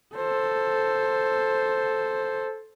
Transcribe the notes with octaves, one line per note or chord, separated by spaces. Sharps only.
A4 C5